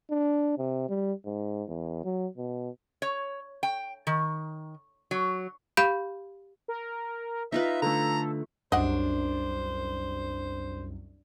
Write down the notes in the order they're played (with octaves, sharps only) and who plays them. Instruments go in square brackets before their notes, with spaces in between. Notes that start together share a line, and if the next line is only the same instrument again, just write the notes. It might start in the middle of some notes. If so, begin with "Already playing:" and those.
[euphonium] D4
C3
G3
G#2
E2
F#3
B2
[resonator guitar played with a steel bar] C#5
G5
D#3
F#3
[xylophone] G4 F5 B5 G6 D7
[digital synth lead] A#4
[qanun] D#4 F4 B4 [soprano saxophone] E5
[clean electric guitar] D3 A3 [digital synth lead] A4 [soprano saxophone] A#5
[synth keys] C2 F#2 [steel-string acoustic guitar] D4 [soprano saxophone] C5 [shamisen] D#5 F#5